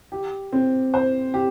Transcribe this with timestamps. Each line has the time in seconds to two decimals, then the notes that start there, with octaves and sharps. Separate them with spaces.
0.12 G4
0.53 C4
0.94 C5
1.34 G4